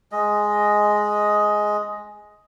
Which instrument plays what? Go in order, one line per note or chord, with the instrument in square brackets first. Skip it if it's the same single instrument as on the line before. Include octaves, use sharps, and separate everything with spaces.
[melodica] G#3 D#5